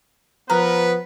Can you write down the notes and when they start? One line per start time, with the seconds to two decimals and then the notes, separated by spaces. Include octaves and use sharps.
0.50 F3 B3 A#4 B4